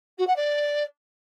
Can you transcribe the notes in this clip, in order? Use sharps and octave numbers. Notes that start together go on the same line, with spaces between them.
F#4
F#5
D5